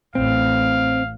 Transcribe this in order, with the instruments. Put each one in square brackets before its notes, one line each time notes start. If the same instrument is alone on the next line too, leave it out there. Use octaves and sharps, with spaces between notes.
[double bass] A1 [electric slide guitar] C4 [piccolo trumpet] F5